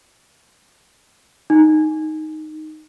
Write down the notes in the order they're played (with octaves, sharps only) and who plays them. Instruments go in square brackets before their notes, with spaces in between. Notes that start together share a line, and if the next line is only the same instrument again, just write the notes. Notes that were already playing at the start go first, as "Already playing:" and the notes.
[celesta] D#4